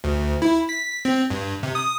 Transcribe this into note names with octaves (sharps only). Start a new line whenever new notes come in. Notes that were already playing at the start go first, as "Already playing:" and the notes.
D2
E4
B6
C4
G2
C3
D#6